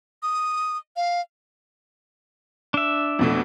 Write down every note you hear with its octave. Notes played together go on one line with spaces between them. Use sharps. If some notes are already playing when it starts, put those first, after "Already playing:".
D#6
F5
D4 E5
F2 B2 A3